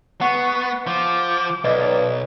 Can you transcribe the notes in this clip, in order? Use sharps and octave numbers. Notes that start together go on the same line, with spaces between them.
B3 F#5 C#6
F3 D6
B1 B4 D5 D#5